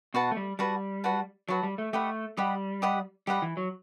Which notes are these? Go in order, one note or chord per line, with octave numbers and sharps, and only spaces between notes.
B2 F#4 B4 F#5 A5
A3
G3
G3 F#4 B4 F#5 A5
F#4 B4 F#5 A5
F#3 F#4 B4 F#5 A5
G3
A3
A3 G4 D#5 F#5 B5
G3 G4 D#5 F#5 B5
G4 D#5 F#5 B5
G3 G4 D#5 F#5 B5
E3
F#3